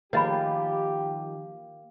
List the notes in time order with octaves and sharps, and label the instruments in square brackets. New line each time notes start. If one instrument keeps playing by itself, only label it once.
[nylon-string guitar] D#3 F3 G#4 [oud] A#3 [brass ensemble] G4 [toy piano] C#5 D#5 B5